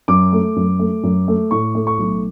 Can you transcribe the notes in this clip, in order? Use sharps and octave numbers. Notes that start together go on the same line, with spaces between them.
F#2 D6
A3
F#2
A3
F#2
A3
A2 C#6
A3
C#6
B1